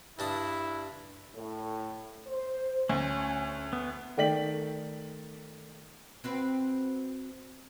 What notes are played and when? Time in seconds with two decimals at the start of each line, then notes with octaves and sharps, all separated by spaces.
0.19 G2 D4 E4 D#6
1.34 A2
2.26 C5
2.89 D2 C#4
3.73 B3
4.17 D#3 A3 D5 G5 B6 F#7
6.24 C4 F#4 B4